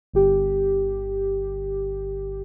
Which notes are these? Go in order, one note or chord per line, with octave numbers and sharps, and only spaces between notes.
G1 G4